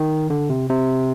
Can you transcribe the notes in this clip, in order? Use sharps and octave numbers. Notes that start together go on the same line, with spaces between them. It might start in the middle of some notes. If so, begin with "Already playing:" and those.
Already playing: D#3
D3
C3
C3